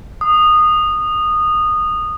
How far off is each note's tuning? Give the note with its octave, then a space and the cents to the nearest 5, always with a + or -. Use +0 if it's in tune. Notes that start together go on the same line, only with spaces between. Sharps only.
D#6 -15